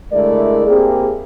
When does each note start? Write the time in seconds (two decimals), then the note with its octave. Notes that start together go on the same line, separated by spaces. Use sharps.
0.12 D3 G#3 A3 E4 A#4 D5
0.67 A#3 C4 E4 G4 G#4